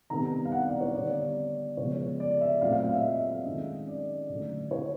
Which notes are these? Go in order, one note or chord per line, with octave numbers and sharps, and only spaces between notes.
C3 D#3 G3 B3 A#5
F5
F#5
D5
C#5
D3 G3 B3 D5
C#3 F3 G#3 B3 C#5
D5
E5
A#2 F#3 A3 C4 F5
F5
F5
E5
D#5
D#3 G#3 C#4
D5
D3 F#3 A3
C#5